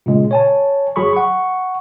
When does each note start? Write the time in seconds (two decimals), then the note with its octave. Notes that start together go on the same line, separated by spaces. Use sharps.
0.06 A#2 C#3 G#3
0.31 C#5 G#5 A5
0.96 G1 F#3 G#4 B5 C#6
1.13 F#5 C#6